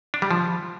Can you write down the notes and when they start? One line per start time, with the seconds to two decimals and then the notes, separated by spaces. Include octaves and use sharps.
0.14 D4
0.22 G3
0.31 F3